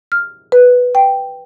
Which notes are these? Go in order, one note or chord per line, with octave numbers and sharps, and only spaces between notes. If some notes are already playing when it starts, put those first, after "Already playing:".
F6
B4
G5